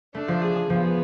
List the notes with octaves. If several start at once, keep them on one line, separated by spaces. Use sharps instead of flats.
A3 D4
F3
G#4
G#4
F3 B3
G#4